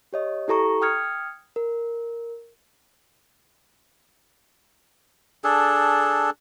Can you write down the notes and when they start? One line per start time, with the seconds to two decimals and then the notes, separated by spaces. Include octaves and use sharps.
0.13 G4 C#5 D#5
0.48 E4 G4 A4 A#5 C#6
0.81 G5 D#6 F6 G#6 C#7
1.56 A#4
5.44 D4 G#4 A4